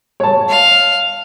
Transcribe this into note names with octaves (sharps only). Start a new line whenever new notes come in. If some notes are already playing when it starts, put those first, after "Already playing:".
C#5 A5
F5